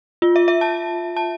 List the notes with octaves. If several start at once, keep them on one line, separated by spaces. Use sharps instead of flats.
F4
E5
E5
A5
A5